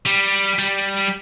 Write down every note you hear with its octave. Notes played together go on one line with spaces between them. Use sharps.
G3
G3